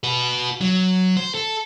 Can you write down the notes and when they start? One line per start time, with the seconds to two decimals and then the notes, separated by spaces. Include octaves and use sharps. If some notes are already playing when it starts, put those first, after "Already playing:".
0.04 F#4 B4
0.61 F#3
1.17 C5
1.34 A4